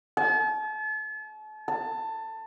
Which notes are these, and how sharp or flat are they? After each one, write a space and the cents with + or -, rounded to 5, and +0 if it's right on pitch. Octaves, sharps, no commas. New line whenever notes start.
A5 -40
A5 +20